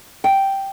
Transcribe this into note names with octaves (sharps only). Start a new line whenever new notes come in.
G5